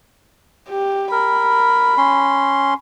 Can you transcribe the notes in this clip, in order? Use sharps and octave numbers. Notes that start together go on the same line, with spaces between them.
G4
A#4 B5
C#4 C6